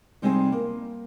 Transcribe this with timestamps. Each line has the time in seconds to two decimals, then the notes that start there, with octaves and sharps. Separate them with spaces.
0.22 C3 G3 G#3 C4 D#4 G#4
0.52 A#3